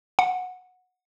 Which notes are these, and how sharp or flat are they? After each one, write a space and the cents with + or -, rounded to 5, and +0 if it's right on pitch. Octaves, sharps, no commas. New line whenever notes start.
F#5 -15